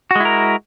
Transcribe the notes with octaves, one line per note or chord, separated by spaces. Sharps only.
G#3 E4 F#4 A#4